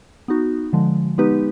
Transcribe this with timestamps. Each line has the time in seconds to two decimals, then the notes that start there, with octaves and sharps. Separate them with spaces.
0.28 B3 D#4 F#4
0.73 D3 F3 G#3
1.18 G#3 B3 D#4 G4 B4